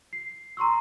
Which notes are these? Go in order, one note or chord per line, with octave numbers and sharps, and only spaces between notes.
C7
A#5 C6 C#6 E6